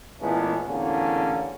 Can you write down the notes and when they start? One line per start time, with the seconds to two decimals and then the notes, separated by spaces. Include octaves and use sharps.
0.20 A#2 E3 G#3 A3 B3 C#4
0.65 A1 E2 D3 A#3 C#4